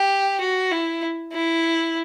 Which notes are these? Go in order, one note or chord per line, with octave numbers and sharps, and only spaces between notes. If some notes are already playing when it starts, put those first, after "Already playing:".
Already playing: G4
F#4
E4
E4